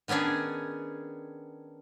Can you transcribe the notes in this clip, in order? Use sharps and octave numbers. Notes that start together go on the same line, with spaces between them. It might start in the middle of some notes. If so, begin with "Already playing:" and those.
D#3 B3 C#4 D4 G#4